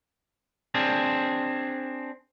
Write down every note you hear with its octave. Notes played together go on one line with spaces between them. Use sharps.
C4 D4 G#4